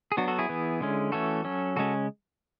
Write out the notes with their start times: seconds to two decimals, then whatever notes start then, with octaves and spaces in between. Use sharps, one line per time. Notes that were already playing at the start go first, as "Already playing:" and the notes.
0.12 G#4
0.17 F#3 B3 D4 F#4
0.28 F#4 A4
0.39 E4 G#4
0.49 E3 B3
0.81 D3 G#3 C#4
1.12 E3 A3 C#4 F#4 A4
1.44 F#3 C#4
1.76 C#3 G#3 C#4 F#4 A4